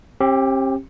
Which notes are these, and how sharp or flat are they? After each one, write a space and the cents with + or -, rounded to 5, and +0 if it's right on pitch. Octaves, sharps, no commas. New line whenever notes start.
C4 +45 G4 +0